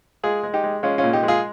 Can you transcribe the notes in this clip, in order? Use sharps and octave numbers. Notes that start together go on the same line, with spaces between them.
G#3 F4 G#4
G#3
D#4 G4
G#3
G#3 C#4 F4
C#4 F4
A#2
D#4 G4
G#3
F4 G#4